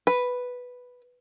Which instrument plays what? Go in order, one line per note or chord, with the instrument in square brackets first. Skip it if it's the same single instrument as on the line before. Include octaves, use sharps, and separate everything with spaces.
[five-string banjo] B4